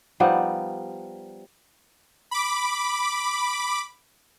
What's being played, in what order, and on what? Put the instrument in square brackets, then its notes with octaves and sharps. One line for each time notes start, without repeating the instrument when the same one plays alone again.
[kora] F3 G3 B3 D#4
[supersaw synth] B5 D6